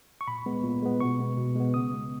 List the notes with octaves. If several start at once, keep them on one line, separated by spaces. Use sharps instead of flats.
C#6
A#2 B5
G#3 B3
A#2
G#3 B3
B2 C#6
G#3 B3
B2
G#3 B3
C#3 D#6
G#3 B3